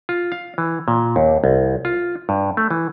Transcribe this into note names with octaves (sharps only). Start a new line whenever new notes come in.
F4
F5
E3
A#2
D#2
C2
F4
G2
A3
E3